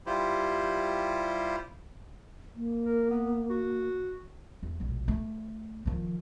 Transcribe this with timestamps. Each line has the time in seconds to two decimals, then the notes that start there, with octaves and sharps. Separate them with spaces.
0.06 G3 E4 F4 G4 C5
2.56 A#3
2.86 A#4
3.10 B3
3.50 F#4
4.63 E2
4.80 E1 A#1
5.08 A3
5.86 D#3 F3